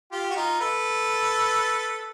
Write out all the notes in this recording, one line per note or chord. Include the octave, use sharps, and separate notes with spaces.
F4 G4
F#4
D#4 F4
A4 B4